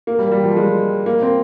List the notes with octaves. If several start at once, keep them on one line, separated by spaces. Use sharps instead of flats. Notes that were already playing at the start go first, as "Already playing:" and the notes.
A#3
G3
G3
F3
G#3
A#3
C4